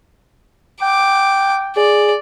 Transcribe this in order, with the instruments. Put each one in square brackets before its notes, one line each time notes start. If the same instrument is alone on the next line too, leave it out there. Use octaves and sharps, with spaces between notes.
[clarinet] G5 [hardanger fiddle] D6
[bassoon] G#4 [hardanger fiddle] D5